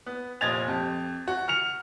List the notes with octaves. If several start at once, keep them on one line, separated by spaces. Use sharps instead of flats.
B3
F1 A#2 D#5 G#6 A6 F7
F2 G4
F#4
F6 C#7 F7